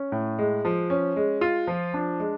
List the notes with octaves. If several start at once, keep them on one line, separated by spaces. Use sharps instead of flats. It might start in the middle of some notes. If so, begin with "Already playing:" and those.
Already playing: C#4
A2
G#3
F3
C#4
G#3
F4
F3
D4
G#3